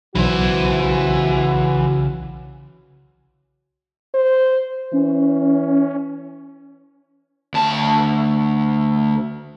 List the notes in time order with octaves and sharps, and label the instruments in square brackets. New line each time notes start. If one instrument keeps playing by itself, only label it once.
[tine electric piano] B1 [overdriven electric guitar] C#3 C5 [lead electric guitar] E3 [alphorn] F#4
[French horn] C5
[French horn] E3 [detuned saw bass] C#4
[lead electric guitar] D2 A5